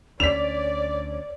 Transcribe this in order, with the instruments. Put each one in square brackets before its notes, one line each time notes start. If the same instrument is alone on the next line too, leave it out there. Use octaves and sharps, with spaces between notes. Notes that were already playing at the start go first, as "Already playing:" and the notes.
[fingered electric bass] D2 C#4 [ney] C#5 [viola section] D5 [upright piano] B6 F7